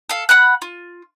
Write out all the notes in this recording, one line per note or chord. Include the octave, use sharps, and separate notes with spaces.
A4 F5
F#5 B5 F#6
F4